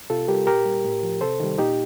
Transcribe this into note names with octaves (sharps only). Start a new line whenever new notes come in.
C3 F4 A4
G3 G4 A#4
A#2 G4 A#4
G3
A2
F3
C3 A4 C5
D#3 G3
A#2 D#4 G4